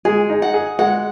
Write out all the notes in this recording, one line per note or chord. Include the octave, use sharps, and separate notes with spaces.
G#3 G#4
D#4
F#5
G#4
G#3 F#5